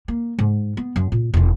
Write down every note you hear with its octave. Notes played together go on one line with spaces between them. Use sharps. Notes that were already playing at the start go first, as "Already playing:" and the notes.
A#3
G#2
B3
F#2
A#2
E1 D#4